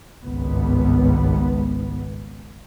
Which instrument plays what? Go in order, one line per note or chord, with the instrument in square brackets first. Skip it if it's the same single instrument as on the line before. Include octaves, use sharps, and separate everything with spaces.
[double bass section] G#1 C#2 G2 B3